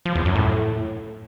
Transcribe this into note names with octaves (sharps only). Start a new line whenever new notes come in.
F3
E2
F#2
A2